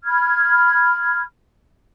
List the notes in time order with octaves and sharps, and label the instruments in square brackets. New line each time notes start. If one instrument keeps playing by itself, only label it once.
[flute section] B5 F6 G#6